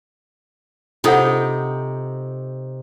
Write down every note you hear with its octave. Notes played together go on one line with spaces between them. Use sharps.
C3 D#4 F4 A4 F#5 G5